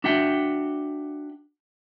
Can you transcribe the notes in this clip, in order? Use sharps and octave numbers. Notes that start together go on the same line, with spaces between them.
D4 F#4 E5 F#5 G5